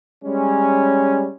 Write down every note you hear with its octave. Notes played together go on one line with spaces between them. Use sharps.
G3 G#3 C#4